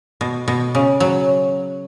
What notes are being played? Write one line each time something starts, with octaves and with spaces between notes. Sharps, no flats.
B2
B2
C#3
F#3